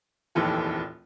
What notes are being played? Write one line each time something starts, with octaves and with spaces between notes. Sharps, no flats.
F1 A#1 D#2 E3 A4